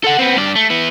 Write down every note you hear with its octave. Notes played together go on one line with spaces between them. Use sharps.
A4 F#5
B3 C4
G2 D5
A3
B3 E4